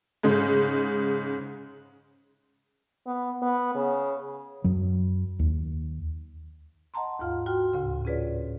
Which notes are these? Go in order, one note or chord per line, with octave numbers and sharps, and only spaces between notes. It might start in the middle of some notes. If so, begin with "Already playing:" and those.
G#2 C#3 G#3
B3
B3
C#3
F#2 F#3
D#2
D#5 F#5 A5 A#5 C6
D#2 G#2 F4 F5
F#4 G5 C6 F6
D2 A2 C#3
C#4 F4 G#4 B4 C#5 D5